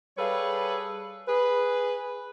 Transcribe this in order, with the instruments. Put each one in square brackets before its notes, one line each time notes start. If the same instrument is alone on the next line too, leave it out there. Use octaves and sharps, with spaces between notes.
[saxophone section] G3 G#4 A4 B4 C#5 F5
G#4 B4